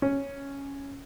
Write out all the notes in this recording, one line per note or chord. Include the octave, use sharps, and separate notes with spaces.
C#4